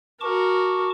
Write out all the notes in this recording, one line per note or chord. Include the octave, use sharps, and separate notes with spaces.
F#4 A#4 A5 C#6 D6